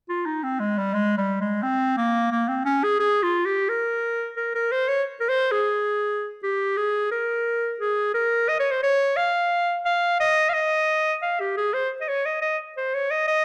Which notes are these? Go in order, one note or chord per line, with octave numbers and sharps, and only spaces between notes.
F4
D#4
C4
G#3
G3
G#3
G3
G#3
C4
A#3
A#3
C4
C#4
G#4
G#4
F4
G4
A#4
A#4
A#4
C5
C#5
A#4
C5
G#4
G4
G#4
A#4
G#4
A#4
D#5
C#5
C5
C#5
F5
F5
D#5
F5
D#5
F5
G4
G#4
C5
D#5
C#5
D#5
D#5
C5
C#5
D#5
D#5